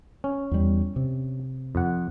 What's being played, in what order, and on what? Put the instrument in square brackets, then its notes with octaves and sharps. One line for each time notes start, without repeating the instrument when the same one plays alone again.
[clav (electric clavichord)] C#4
[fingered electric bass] E2 G3
C3
[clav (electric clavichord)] F2 F#5